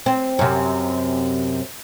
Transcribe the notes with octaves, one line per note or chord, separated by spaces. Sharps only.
C4
F#2 C3